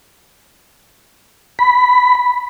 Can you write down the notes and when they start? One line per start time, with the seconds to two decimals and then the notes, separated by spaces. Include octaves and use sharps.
1.59 B5